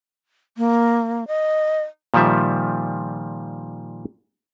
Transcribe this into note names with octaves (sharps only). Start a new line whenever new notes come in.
A#3
D#5
A#2 D#3 F3 G3 E5